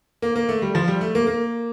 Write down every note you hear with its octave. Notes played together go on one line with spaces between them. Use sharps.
A#3
A#3
A3
G3
F3
G3
A3
A#3
A#3